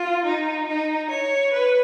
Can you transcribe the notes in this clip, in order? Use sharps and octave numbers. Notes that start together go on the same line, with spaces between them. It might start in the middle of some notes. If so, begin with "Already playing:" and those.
Already playing: F4
D#4
D#4
C#5
B4